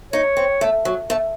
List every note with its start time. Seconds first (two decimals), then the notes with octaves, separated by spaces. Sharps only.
0.13 D#4 C#5
0.37 C4
0.61 A3
0.85 F#3
1.10 A3